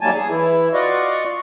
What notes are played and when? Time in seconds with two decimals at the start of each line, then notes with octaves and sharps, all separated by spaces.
0.01 D#3 F#3 G3 A#3 G#5 A5
0.16 G#4
0.29 E3 E4
0.74 F4 F#4 D5 D#5 C#6